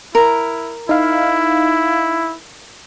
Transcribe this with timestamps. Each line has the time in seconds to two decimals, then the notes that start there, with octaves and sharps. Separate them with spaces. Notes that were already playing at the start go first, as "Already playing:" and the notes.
0.15 E4 A#4
0.89 D#4 E4 F5